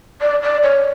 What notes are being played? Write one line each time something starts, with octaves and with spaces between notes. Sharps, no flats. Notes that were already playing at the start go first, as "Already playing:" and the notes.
D5
D5
C#5